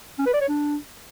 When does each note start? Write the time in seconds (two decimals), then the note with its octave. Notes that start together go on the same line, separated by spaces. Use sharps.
0.19 C#4
0.26 B4
0.34 D5
0.41 C#5
0.49 D4